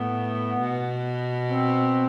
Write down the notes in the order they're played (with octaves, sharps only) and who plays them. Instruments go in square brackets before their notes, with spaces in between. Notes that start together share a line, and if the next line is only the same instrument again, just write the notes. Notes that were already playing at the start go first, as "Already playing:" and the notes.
Already playing: [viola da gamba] A2 [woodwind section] B3
[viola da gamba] B2
[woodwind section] C4